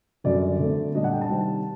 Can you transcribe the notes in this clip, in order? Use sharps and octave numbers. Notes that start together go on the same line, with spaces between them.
F#2 D3 G3 D5
D3 A3 C4
A#2 G3 D4 D#5
F#5
G5
A5
C3 D#3 G3 C4